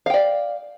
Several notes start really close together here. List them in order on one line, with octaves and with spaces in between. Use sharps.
F5 G5 D5